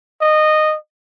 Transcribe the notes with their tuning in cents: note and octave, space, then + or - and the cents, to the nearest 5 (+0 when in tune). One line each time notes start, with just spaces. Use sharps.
D#5 -15